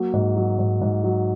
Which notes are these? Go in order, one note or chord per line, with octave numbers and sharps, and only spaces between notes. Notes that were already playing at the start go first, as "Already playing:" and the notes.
Already playing: F#3 A#3
G#2
F#3
G#2
G#2
F#3